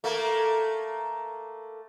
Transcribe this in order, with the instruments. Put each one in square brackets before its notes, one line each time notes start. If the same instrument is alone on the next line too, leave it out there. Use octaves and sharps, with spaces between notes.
[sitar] A3 A#3